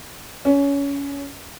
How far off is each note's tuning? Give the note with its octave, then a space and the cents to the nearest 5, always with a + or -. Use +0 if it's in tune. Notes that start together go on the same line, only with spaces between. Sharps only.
C#4 +20